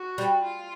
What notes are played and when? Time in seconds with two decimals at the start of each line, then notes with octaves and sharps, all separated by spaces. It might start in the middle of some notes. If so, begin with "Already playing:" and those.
Already playing: F#4
0.18 G3
0.44 F4